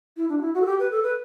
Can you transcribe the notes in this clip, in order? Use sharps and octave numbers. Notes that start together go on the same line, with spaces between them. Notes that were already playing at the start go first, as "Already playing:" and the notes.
E4
D4
F#4
E4
F#4
A4
G4
B4
A4
B4